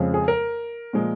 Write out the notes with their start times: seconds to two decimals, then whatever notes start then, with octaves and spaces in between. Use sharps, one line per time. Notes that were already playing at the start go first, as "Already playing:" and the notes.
Already playing: F2 C#3 F3 G#3
0.14 G#4
0.28 A#4
0.93 A#2 F3 G#3